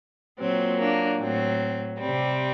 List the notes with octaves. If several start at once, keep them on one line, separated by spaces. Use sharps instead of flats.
A#2 F#3 C4
A#3 D4
A2 F#3 C4
C3 G3 C4